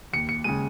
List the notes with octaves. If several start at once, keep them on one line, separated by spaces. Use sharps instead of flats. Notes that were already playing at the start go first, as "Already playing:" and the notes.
D#2 C#7
C#7
C#3 G#3 D#7